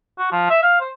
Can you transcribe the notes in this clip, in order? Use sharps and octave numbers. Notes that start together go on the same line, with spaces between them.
F#4
F3
E5
F5
C5